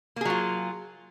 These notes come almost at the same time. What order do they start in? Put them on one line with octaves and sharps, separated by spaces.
A#3 G#4 F#3 F4